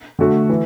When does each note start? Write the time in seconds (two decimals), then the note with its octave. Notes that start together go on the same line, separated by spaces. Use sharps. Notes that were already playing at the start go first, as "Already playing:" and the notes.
0.19 D3 A3 F#4
0.49 E3